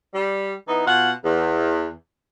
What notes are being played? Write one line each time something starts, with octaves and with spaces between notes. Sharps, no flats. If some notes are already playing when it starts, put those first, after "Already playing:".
G3
E3 B3 D#4
B2 F4 F#5
E2